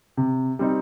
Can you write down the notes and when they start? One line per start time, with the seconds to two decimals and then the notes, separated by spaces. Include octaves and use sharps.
0.17 C3
0.59 G3 C4 D#4